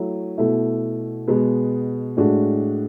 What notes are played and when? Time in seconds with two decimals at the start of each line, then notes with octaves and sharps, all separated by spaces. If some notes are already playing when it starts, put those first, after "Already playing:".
Already playing: F#3 A3 E4
0.38 B2 A3 E4
1.28 B2 G#3 B3
2.17 A2 G#3 D4 F#4